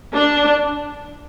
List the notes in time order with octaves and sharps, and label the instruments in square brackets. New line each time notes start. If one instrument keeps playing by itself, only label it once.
[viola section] D4